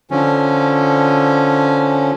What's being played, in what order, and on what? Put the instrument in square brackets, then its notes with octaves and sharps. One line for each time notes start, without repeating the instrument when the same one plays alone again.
[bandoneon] D3 F3 C#4